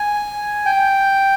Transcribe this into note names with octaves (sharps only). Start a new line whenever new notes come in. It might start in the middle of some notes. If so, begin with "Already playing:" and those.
Already playing: G#5
G5